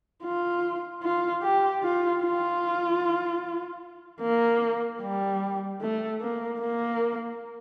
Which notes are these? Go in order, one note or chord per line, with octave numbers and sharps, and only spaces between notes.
F4
F4
G4
F4
F4
A#3
G3
A3
A#3
A#3